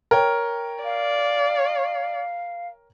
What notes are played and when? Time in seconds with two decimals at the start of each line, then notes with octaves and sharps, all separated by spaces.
0.11 A#4 C#5 G5
0.84 D5 F5